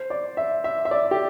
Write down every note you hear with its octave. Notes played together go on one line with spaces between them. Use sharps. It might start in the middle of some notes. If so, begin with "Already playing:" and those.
Already playing: C5
D5
E5
E5
E5
D5
G4